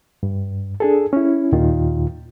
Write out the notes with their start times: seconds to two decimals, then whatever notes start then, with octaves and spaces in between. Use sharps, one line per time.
0.23 G2
0.80 D4 G#4 A4
1.13 C#4 E4
1.52 D#2 A#2 D#3 F4